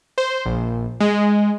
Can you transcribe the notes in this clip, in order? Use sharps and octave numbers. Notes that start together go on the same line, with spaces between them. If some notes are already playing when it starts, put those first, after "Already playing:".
C5
A#1
G#3